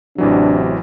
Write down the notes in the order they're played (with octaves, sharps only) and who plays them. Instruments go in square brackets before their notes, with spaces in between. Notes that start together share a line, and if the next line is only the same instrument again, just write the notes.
[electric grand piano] A1 E3 F#3 [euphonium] C3 [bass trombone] D4